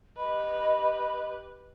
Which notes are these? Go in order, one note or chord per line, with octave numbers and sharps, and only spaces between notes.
G4 B4 D#5 B5